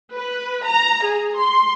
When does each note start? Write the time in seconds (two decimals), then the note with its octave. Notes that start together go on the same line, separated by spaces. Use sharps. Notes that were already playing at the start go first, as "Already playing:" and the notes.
0.14 B4
0.65 A#5
1.04 G#4
1.39 C6